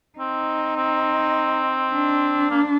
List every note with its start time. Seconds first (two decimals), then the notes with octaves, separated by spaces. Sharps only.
0.18 C4 D#4
0.76 C4
1.93 D4
2.51 A#3